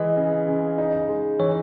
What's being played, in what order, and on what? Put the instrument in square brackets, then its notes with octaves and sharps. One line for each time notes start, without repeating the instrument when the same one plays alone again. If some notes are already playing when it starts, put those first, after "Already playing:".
Already playing: [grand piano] E3 G#3 [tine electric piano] D#5
[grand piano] C#3
C#3
D#4
G#3
[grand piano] E3 [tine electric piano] C#5